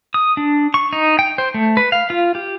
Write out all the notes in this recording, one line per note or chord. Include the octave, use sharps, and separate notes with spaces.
D#6
D4
C#6
D#4
G5
C5
A3
B4
F5
F4
G4